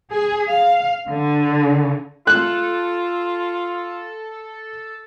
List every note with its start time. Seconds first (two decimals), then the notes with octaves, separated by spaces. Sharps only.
0.11 G#4
0.50 F5
1.08 D3
2.27 F4 A4 F#6